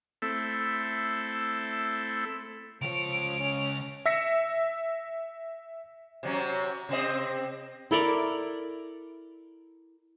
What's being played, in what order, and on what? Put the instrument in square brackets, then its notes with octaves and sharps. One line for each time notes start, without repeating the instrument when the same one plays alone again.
[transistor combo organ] A3 C4 E4 A4
[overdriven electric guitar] C#2 C#5 [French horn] F3 [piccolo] D7 [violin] F7
[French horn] C#4
[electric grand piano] E5 E6 A#6 B6 C#7
[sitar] C3 F#3 C#4
C3 C4 D#5
[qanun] E4 A4 A#4 D5